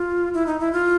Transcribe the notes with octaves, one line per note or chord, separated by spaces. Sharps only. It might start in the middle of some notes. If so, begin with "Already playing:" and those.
Already playing: F4
E4
D#4
E4
F4